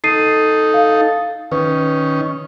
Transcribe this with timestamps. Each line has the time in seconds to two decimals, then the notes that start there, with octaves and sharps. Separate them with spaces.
0.04 D#4 A4 C7 D#7
0.74 F5
1.52 D#3 C#4 B4